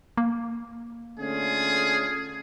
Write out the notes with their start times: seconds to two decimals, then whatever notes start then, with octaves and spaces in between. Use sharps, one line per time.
0.17 A#3
1.18 D3 A3 C#4 F4 G#4